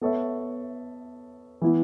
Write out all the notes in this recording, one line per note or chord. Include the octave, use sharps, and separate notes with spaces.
B3 A4 C#5 E5
E3 B3 E4